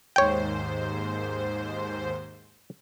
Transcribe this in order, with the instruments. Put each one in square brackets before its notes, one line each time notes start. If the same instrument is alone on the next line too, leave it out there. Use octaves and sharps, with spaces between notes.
[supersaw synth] D#2 G#2 C5 [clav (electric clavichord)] C#5 G5